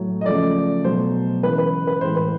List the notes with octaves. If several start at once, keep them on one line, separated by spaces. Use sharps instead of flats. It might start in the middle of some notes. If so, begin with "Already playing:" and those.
Already playing: A2 F#3 A3
D#5
C#3 F3 A3 D5
B2 F#3 A3 C5
C#3 E3 G#3 B4
B4
B4
A2 E3 G#3 C5
B4